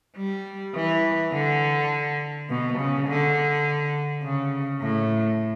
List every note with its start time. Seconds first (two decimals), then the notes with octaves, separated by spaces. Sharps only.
0.17 G3
0.75 E3
1.33 D3
2.49 B2
2.78 C#3
3.07 D3
4.23 C#3
4.81 A2